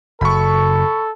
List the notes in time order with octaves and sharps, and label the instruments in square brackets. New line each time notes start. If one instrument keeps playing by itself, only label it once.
[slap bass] F#1 [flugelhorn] A4 [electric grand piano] B5 C#6